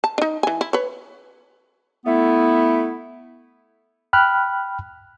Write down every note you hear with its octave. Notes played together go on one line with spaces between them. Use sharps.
A5
D4 D#4
E3 G#5
E4
B4 C#5
A3 B3 E4
G5 B5 F6 F#6